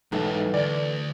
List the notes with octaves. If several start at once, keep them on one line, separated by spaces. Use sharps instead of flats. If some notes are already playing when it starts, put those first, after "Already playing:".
B1 G#2 E3 A3 A5
D2 D5